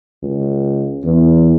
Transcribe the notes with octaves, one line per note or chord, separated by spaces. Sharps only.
C#2
E2